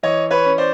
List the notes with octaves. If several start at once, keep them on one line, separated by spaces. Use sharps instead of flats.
E3 C#5 D#5
B4 C#5
C#4
C5 D5